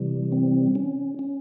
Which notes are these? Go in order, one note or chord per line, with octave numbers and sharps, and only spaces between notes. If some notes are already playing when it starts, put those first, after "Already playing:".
Already playing: C3 E3 G3
C4
C#4
C#4